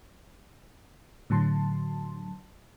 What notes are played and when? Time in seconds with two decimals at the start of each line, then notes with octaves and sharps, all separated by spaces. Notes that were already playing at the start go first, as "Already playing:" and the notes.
1.30 A2 D3 F#3 A5 C6